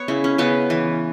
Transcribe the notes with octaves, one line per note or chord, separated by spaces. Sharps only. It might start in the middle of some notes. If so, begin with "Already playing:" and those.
Already playing: B3 C#5
C#3 E4
C#4
C#3 B3
E3